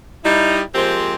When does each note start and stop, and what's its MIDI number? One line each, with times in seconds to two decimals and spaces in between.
0.24 0.61 55
0.24 0.61 63
0.24 0.61 64
0.75 1.15 53
0.75 1.15 56
0.75 1.15 58
0.75 1.15 60
0.75 1.15 67
0.75 1.15 72